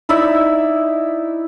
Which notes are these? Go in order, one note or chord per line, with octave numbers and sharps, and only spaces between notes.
D#4 E4 D5 E5